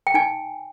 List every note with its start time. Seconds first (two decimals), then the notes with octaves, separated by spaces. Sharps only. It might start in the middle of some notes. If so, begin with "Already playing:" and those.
0.07 G5
0.14 D#4 G#5